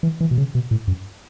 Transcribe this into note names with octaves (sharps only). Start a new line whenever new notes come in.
E3
E3
B2
C#3
B2
A2
F#2